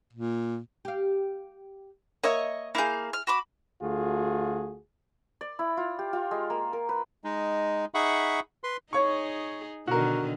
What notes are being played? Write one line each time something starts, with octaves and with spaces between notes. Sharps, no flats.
A#2
G4 F5
A#3 C#5 D#5 E5
A#3 E4 G#4 F5 G6
F6
F#4 B5 D6
D2 A3 F4 F#4 G#4
D5
E4
F4
G4
F4
G#3
A#3
A#4
B4
G#3 D#4
D#4 G#4 E5 F#5 B5 C#6
B4 C6
D#4 G#4 C#5 C#6
B2 D3 D#3 F#4 A#4